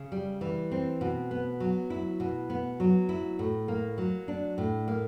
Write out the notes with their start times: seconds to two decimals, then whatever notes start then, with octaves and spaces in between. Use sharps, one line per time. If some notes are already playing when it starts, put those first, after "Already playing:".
Already playing: C#3
0.12 G3
0.41 E3
0.71 C4
1.01 B2
1.31 B3
1.60 F#3
1.90 E4
2.20 B2
2.50 B3
2.80 F#3
3.09 E4
3.39 A2
3.68 A#3
3.98 F#3
4.28 D4
4.58 A2
4.88 A#3